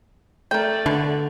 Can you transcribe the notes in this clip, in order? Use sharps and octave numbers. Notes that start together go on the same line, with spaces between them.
A3 A#4 D5 G5
B2 D3